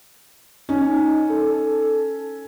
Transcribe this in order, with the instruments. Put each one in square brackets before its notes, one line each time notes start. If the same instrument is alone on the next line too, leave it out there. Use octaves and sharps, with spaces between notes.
[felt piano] C#4 [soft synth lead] D#4
[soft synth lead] A4